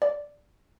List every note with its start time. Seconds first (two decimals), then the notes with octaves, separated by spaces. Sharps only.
0.02 D5